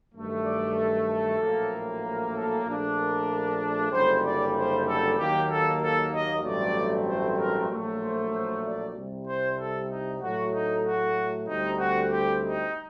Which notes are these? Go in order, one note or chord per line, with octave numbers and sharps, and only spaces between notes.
G2 D#3 F#3 A3
D5
A4
A4
A#1 A2 F#3 A#3
A#4
A4
A#1 A#2 A3 D4
A#4
F#1 F#2 D3 G3 C5
D5
C5
A4
D#2 D#3 F#3 A#3 G4
A4
A4
D#5
A1 G2 F#3 A3 C4 D5
C5
A#4
A#1 A2 F#3 A3
C5
C5
D5
C2 C3 G3
C5
A4
D#4
A2 F#3 A3 F#4
D#4
F#4
D2 D3 G3 C4 D#4
F#4
G4
D#4